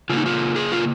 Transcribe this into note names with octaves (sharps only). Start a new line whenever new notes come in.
C#3 A#3 D#4 F4
F4
G#4
F4